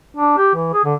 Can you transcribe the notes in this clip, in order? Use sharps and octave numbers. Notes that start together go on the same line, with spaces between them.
D4
G4
E3
G#4
D3